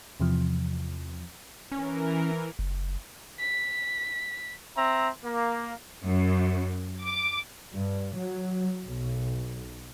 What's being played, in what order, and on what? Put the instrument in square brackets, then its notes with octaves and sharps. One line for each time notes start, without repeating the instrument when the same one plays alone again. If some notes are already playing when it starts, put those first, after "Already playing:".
[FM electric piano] E2 C3 E3 F3
[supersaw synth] E3 A#4 [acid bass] C#4
[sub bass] F#1
[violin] B6
[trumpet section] C4 E5 A#5
A#3
[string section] F#2
D6
[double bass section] G2
F#3
B1